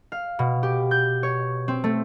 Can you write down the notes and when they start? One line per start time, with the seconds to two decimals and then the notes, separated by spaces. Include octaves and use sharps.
0.12 F5
0.39 B2
0.63 G4
0.91 G6
1.23 C#5
1.68 C4
1.84 A3